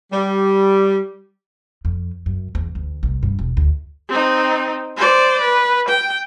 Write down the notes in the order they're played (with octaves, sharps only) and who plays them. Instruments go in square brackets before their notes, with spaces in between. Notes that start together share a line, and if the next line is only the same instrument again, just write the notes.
[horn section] G3
[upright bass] F2
F#2
E2
D2
C2
G2
E1
D2
[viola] C4 D#4
C5 D5
B4
G5